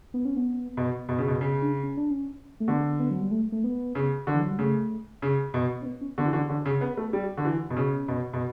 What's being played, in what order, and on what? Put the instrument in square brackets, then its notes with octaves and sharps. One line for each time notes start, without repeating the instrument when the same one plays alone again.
[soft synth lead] B3
C#4
B3
[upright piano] B2
B2
C#3
B2
C#3
[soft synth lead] D4
C#4
D4
C#4
A3
[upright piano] D3 [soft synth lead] B3
[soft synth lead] B3
F#3
G3
A3
A3
B3
[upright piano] C#3
D3
[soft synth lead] E3
F#3
G3
[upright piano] C#3 [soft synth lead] A3
[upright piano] C#3
B2
[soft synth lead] C#4
B3
C#4
[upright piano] D3 [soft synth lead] B3
[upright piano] E3
[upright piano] D3 [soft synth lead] C#4
[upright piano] D3 [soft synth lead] C#4
[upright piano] C#3
B3
A3
G3
D3
E3
B2
[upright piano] C#3 [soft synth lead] C#4
[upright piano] B2
B2